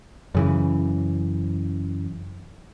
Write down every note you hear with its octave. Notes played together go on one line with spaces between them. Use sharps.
F#2 C#3 E3